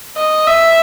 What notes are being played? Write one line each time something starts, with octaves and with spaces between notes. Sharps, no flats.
D#5
E5